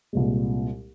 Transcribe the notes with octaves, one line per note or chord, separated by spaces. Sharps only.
C2 A#2 G#3